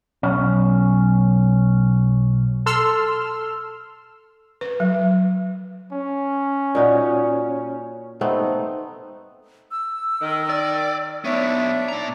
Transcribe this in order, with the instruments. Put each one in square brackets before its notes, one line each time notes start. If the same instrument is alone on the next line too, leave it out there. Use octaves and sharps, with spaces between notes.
[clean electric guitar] B1 C#4
[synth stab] A4 C6 E6 F6
[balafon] B4
F#3
[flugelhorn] C#4
[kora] A#2 D#4 F#4
[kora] A3 B3 C4 [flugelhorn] D#4
[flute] E6
[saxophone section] D#3
[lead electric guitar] D5
[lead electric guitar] B3 D#4 [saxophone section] D4 C#5 [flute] E5
[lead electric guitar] A#2 A#5